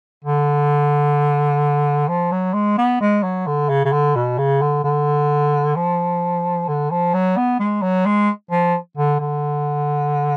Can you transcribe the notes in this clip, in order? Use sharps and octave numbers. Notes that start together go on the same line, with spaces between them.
D3
F3
F#3
G#3
B3
G#3
F#3
D3
C#3
C#3
D3
B2
C#3
D3
D3
F3
D3
F3
F#3
B3
G#3
F#3
G#3
F3
D3
D3